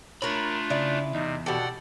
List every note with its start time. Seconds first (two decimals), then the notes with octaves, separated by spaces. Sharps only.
0.22 A3 D4 F4 A#4 C#5 B5
0.70 C#3 E4 D5
1.14 E2 C3 D#4
1.46 B2 G4 A4 D5 F#5